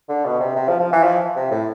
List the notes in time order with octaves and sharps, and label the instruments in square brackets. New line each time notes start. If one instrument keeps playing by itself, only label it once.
[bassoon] D3
B2
C3
C3
F3
F3
E3
F3
C3
A2